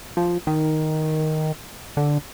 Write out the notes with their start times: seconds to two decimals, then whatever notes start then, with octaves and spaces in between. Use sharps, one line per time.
0.17 F3
0.47 D#3
1.97 D3